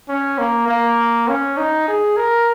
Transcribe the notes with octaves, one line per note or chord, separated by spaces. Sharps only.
C#4
A#3
A#3
C#4
D#4
G#4
A#4